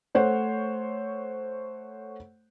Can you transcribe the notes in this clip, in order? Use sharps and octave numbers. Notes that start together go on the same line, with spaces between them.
A3 C5 C#5 F#5